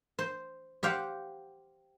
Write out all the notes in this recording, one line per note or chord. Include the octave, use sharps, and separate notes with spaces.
C5
G4 C5 F5 F#5